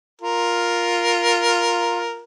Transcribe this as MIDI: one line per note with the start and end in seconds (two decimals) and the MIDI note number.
0.21 2.21 65
0.21 2.21 70